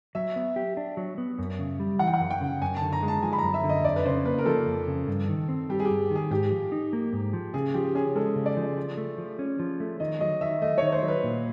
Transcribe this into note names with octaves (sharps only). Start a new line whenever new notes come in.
F#3 E5
B3
G4
D4
F#3
B3
F#2
C#3
G3
E3 F#5
G5
F#5
F#2
G5
C#3
F#2 G#5
A5
D3
A#5
G#3
A5
F3 G#5
B5
F#2 A#5
E5
D3
D#5
F2 D5
B4
C#3 C5
A#3 B4
A#4
F3 A4
F2
C#3
G2
D#3
C4
G3 G4
G#4
G2 G4
D#3
G#4
G#2 G4
F3
D#4
A#3
G#2
F3
C#3 G#4
F3 G4
C#4 G#4
G#3 A4
C#3
D5
F3
F3
A3
F3
C#4
F3
A3
D#3 D#5
F#3 D#5
D#3 E5
A3 D#5
D#3 C#5
C5
F#3
B4
A#2